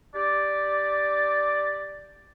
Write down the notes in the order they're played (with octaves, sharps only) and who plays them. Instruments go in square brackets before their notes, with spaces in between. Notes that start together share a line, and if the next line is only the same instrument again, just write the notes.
[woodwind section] D4 G4 D5